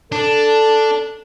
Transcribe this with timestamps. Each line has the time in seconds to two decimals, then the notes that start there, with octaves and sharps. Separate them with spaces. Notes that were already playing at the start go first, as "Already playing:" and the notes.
0.12 D4 A4